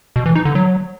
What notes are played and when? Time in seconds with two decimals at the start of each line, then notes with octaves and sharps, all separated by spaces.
0.16 B2
0.26 E3
0.36 D#4
0.45 D3
0.55 F#3